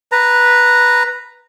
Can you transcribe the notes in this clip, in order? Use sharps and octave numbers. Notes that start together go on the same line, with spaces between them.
B4 A#5